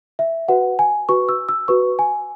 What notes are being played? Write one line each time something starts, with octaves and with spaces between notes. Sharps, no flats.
E5
F#4 B4 F#5
G#5
F#4 B4 C#6
E6
E6
F#4 B4 C#6
G#5